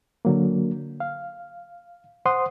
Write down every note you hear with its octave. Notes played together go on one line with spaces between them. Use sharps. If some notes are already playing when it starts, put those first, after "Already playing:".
D3 F#3 A#3
F5
C5 F#5 C6 D#6